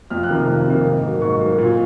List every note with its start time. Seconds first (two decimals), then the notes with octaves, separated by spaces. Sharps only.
0.10 F2 F6
0.23 F#6
0.29 C3 D#3 A#3
0.35 F6
0.48 F2
0.67 C3 D#3 A#3
0.85 G#2
1.03 F#3 A#3
1.22 G#2 C#6
1.40 F#3 A#3
1.58 A#2